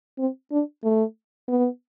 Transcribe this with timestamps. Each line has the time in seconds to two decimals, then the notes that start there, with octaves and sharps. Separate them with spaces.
0.18 C4
0.52 D4
0.84 A3
1.48 B3